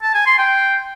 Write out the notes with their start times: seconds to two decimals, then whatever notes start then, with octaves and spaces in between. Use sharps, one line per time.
0.02 A5
0.14 G#5
0.26 C6
0.38 G5